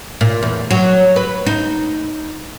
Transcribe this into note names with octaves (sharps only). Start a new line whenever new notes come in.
A#2
E2
F#3
B4
D#4